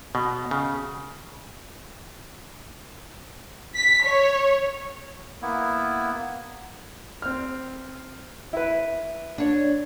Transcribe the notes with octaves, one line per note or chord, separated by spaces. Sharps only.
B2
C#3
B6
C#5
A#3 B3 E4
C4 F6
E4 B4
D4 C#5